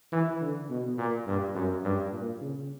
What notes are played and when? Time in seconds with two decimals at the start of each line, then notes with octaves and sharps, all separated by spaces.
0.12 E3
0.41 D3
0.69 B2
0.98 A#2
1.26 G2
1.55 F#2
1.84 G2
2.12 A#2
2.41 C#3